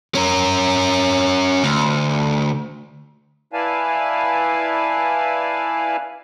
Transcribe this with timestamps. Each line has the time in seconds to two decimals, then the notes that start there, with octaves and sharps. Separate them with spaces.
0.15 C#4 A#4
1.64 D2
3.53 E4 B4 D5 F5 G#5 A5